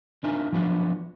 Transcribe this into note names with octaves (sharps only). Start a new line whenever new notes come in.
D4 D#4 F4 A#4 E5 G#5
F3 F#3 B3 D4 F4